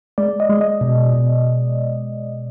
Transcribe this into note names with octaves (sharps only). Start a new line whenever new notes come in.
G#3 D5
D#5
G#3
D#5
B2
B2